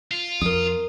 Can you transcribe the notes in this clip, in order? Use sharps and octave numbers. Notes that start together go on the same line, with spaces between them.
F4
F2 A#4 D#6